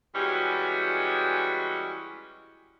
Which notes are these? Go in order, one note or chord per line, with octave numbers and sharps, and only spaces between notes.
E3 G3 G#3 C#4 F#4 G4